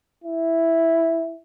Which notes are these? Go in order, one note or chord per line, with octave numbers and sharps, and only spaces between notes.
E4